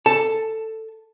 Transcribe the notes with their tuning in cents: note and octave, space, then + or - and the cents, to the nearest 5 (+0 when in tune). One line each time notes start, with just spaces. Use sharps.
A4 +10 A5 +0